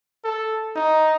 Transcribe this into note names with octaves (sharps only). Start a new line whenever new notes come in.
A4
D#4